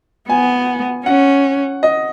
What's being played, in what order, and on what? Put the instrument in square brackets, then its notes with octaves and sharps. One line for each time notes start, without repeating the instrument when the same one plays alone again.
[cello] B3 [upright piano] G#5
[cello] C#4 [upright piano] F#5
[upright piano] D#5